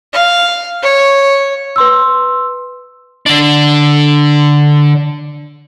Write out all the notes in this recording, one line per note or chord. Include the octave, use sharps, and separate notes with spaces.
F5
C#5
B4 C6 E6
D3 D4